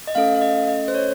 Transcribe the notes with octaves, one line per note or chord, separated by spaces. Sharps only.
D#5
A3 C#4 A4 F5
F5
D#5
D#5
C5
C#5